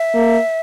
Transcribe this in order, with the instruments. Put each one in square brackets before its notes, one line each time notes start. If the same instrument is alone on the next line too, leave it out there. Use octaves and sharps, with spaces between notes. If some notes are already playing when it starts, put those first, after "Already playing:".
Already playing: [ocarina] E5
[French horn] A#3